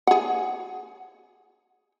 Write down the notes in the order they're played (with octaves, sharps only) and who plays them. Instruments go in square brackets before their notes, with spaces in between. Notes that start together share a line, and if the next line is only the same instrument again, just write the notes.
[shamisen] G#4 F#5